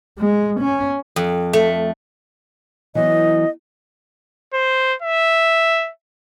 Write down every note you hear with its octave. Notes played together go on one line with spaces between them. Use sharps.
G#3
C#4
F2
A3
E3 F#3 B3 D#5
C5
E5